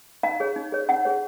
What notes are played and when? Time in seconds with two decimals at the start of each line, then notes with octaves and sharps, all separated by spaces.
0.23 D#4 F5
0.40 G#4 C#5
0.56 D#4
0.72 G#4 C#5
0.89 D#4 F#5
1.05 G#4 C#5